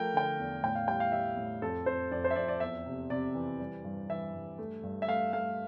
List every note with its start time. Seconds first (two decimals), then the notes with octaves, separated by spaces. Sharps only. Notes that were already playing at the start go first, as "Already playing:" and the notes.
Already playing: F3 A3 A#4 G5
0.14 D3 G5
0.38 E2
0.63 A2 G5
0.75 F5
0.88 G3 G5
1.00 F5
1.12 G3 E5
1.37 A2
1.62 F2 A4
1.86 F2 C5
2.12 F2 D5
2.24 C5
2.30 E5
2.36 F2 D5
2.48 D5
2.60 E2 E5
2.86 C3
3.10 C3 D5
3.34 E3
3.59 G3
3.84 G2
4.09 E3 E5
4.34 G2
4.58 A3
4.83 G2
5.02 E5
5.08 A3 F5
5.33 A3 F5